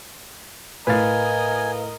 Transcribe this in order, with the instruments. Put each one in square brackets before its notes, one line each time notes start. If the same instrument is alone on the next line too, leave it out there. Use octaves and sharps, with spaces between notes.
[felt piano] A2 A6 [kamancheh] A#4 D#5 [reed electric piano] B4 F5 [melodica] G#5